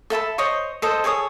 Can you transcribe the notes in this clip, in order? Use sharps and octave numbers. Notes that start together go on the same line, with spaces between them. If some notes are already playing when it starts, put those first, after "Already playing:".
A4 E5 A5 B5
C5 C#5 D#5 C#6
A4 C5 D#5
G#4 A4 C#5 D#6